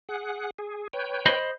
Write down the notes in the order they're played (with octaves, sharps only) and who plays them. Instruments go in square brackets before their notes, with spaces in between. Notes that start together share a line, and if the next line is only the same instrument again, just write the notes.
[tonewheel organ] G#4 F#5
G#4
B4 C#5 G5
[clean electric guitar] C5 D#5 B5